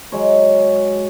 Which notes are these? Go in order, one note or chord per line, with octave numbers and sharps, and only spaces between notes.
F#3 G#3 C#5